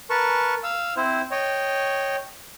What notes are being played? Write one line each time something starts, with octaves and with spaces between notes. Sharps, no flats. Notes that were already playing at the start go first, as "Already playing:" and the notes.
A#4 B4 A5 C#6
F5 E6
C4 E4 C5
C#5 D#5 G5